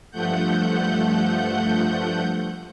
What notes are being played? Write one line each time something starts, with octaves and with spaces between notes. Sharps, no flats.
G2 F3 A3 F#5 G6